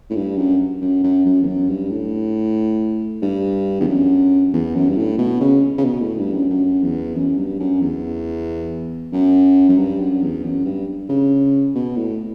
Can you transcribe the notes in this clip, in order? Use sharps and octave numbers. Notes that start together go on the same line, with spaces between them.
A2
G2
F#2
F#2
F#2
F#2
E2
F#2
G2
A2
G2
E2
F#2
E2
F#2
G2
A2
B2
C#3
C#3
B2
A2
G2
F#2
F#2
E2
F#2
G2
F#2
E2
F#2
F#2
G2
F#2
E2
F#2
G2
C#3
B2
A2